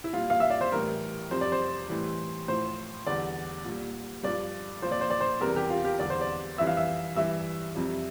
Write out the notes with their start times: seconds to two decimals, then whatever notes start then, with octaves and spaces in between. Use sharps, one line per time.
0.04 E4
0.13 A#2 G3 F4
0.30 F5
0.40 E5
0.50 D5
0.61 C5
0.72 A2 E3 G3 A#4
1.31 F2 C3 G3 C5
1.41 D5
1.52 C5
1.89 A2 E3 G3
2.48 A2 F3 C5
3.07 E2 D3 G3 D5
3.65 A#2 G3
4.24 G2 F3 D5
4.82 A#2 F3 C5
4.92 D5
5.01 C5
5.10 D5
5.21 C5
5.41 E2 C3 E3 G3 A#4
5.56 G4
5.70 F4
5.85 G4
5.99 E2 D3 G3 D5
6.10 C5
6.21 D5
6.58 F2 E3 G3 E5
6.67 F5
6.77 E5
7.16 G2 E3 G3 E5
7.75 F2 C3 G3